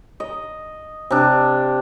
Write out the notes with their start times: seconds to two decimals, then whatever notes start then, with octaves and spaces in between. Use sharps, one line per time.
0.20 D#5
1.11 C3 D4